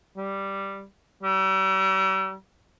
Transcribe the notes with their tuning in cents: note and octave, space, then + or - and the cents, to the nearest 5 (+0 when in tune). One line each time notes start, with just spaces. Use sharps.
G3 +0
G3 -40